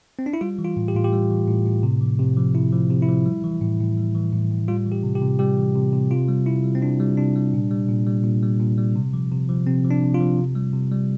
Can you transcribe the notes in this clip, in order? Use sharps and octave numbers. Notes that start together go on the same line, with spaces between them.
C4
D4
E4
G3 F4
E3
F4
A2
G4
A2 F4
G4
G3
E3
A2
A2
C3
F3
C3
F3
C3 E4
F3
C3
E4
F3
G3
E3
A2
A2
G3
E3
A2
A2
G3 F4
E3
G4
C3
G4
C3
G3 G4
E3
C3
C3
C3 F4
G3
C3 E4
G3
C4
C3 D4
G3
C3 D4
G3
A#2
G3
A#2
G3
A#2
G3
A#2
G3
C3
F3
C3
F3
C3 C4
F3
D4
C3
F4
F3
C3
G3
C3
G3